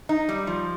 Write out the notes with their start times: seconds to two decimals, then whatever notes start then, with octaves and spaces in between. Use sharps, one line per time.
0.09 D#4
0.29 G3
0.47 F3